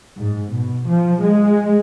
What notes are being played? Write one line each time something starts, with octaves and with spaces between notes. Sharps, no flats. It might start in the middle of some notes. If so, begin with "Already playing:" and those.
G#2
B2
F3
G#3